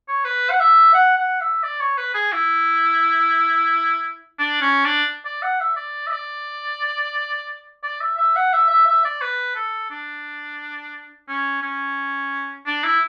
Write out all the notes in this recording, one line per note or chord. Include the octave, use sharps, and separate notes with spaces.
C#5
B4
F#5
E5
F#5
F#5
E5
D5
C#5
B4
G#4
E4
D4
C#4
D4
D5
F#5
E5
D5
E5
D5
D5
E5
E5
F#5
E5
E5
E5
D5
B4
A4
D4
C#4
C#4
D4
E4